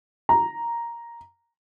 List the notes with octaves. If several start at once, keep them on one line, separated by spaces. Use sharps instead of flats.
A#5